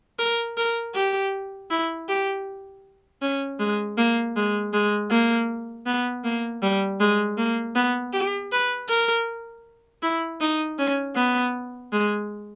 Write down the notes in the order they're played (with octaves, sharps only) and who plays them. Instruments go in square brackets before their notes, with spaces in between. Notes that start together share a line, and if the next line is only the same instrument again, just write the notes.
[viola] A#4
A#4
G4
E4
G4
C#4
G#3
A#3
G#3
G#3
A#3
B3
A#3
G3
G#3
A#3
B3
G4
B4
A#4
E4
D#4
C#4
B3
G#3